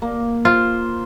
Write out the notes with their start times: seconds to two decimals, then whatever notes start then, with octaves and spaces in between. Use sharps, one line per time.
0.02 A#3
0.45 F4 C5